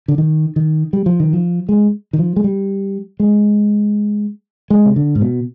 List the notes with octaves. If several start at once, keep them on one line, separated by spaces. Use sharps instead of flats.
D3
D#3
D#3
G3
F3
D#3
F3
G#3
D#3
F3
G#3
G3
G#3
G#3
C3
D3
G#2
B2